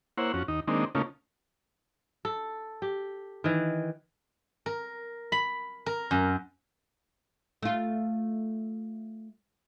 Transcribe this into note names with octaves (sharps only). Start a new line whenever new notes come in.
A#3 E4 C5 C#5 F#5
F2 C#4 F#4
D#2 D#4
D#3 G#3 A#3 C4 D4 D#4
C#3 A3 A#3 C#4 D#4 F4
A4
G4
D#3 E3
A#4
B5
A#4
F#2
A3 F4